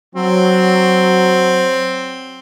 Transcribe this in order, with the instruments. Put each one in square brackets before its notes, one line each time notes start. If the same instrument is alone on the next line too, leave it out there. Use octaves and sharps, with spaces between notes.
[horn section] F#3 [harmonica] C4